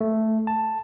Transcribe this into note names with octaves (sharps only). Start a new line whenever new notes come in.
A3
A5